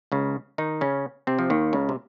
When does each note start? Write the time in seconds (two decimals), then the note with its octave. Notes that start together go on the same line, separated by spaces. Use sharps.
0.12 C#2 C#3
0.58 D#3 D#4
0.81 C#3 C#4
1.27 C3 C4
1.39 F3
1.50 D#2 D#3
1.73 C#2 C#3
1.89 C3